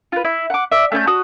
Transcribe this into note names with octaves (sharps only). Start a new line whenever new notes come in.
F4 B4
E4
F#5 D6
D5 E5
A3 C#4 G#5 G6
F#4 D#6